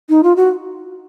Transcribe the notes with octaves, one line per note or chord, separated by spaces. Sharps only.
D#4
F4
F#4